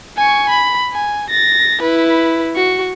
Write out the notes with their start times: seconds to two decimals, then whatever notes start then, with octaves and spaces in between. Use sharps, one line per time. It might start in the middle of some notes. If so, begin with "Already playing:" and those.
0.17 G#5 C#6
0.50 B5
0.93 G#5
1.30 A6 A#6
1.82 E4 B4
2.56 F#4 C#6